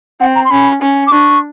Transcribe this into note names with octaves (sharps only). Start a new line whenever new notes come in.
C4 F#5
A#5
C6
C#4 B5
C#4
D6
D4 C#6